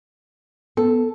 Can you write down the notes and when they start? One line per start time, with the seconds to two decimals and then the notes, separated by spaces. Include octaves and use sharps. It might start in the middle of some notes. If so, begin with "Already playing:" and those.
0.77 B3 A4